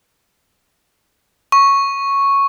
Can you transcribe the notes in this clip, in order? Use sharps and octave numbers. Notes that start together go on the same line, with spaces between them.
C#6